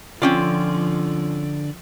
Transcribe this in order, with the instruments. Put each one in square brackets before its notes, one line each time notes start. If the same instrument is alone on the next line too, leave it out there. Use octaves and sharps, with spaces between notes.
[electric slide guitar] D3 D5 [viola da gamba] F3 [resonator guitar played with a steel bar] C4 C#4 F4